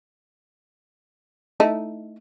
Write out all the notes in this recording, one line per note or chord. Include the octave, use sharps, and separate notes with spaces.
A3 D#4 E4